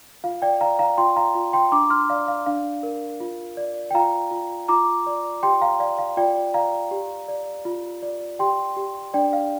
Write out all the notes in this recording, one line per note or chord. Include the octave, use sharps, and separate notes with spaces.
F4 F5
D5 G5
D5 F5 A#5
F5 A#5
F4 G5 C6
F5 A#5
F4
G5 C6
D4 A#5 D6
C6 F6
D5 F5
F5
D4 F5
A#4
F4
D5
G5
F4 F5 A#5
F4
F4 A#5 D6
D5
G4 G5 C6
F5 A#5
D5 F5
F5
F4 D5 G5
D5 F5 A#5
G4
D5
F4
D5
G4 G5 C6
G4
D4 D5 G5
F5